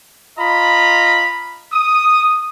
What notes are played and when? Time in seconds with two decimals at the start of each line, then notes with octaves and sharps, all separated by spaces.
0.38 F4 D#5 A#5 B5
1.73 D#6